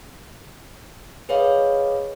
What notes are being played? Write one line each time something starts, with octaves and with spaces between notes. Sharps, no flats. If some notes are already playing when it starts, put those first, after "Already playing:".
G#4 B4 C#5 D#5 F5